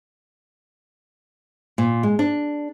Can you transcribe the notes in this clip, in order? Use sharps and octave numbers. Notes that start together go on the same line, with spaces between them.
A#2
G#3
D4